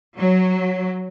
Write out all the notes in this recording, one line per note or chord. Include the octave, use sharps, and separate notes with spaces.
F#3